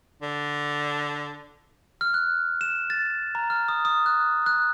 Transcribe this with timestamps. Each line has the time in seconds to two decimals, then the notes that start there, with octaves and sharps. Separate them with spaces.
0.22 D3
2.01 F6
2.14 F#6
2.61 E7
2.90 A6
3.35 A#5
3.50 F6
3.68 D#6
3.85 D#6
4.06 F#6
4.46 F#6